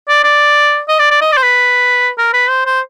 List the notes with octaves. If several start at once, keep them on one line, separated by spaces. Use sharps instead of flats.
D5
D5
D#5
D5
D5
D#5
D5
C5
B4
A#4
B4
C5
C5